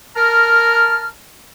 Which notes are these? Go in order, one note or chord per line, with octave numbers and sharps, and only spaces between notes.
A#4 A5 A#5 F6